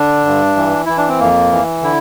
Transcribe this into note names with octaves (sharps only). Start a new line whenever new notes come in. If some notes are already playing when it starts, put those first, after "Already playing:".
Already playing: D3 D4
G2
E3
E3 E4
D4
C4
F2 A#3
E3
D3 E4